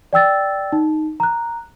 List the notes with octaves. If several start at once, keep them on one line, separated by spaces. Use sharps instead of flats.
D5 G5 E6 A6
D#4
A#5 F#6